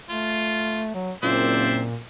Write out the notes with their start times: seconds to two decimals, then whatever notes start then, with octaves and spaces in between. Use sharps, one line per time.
0.09 A3 F4
0.95 F#3
1.23 F#1 A#2 C4 C5 D5 E5